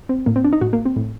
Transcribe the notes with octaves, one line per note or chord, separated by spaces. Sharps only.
C4
A2 A#3
C4
D4
D#4
A2 F#4
A#3
C4
A2